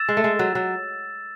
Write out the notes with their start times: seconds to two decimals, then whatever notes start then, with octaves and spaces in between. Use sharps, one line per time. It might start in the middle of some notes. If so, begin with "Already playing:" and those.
Already playing: E6 A6 E7
0.09 G#3
0.17 A3
0.24 G#3
0.39 F#3
0.55 F#3